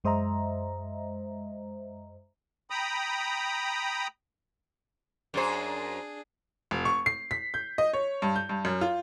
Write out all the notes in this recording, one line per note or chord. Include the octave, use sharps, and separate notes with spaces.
F#2 G#3 C5 D#5 E5 A#5
G5 A#5 B5 D#6
F#2 D4 G#4 C5
F1
C#6
C7
B6
G6
D#5
C#5
G2
G6
G2
F#2
F4